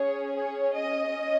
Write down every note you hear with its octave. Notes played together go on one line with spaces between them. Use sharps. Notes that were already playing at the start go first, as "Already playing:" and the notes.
Already playing: C#4 G#4 C#5
C#5
D#5
C#4